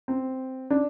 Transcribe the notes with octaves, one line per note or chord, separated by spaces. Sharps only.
C4
D4